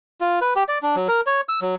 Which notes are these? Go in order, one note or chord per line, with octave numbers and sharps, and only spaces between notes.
F4
B4
G4
D5
D4
F#3
A#4
C#5
E6
F#3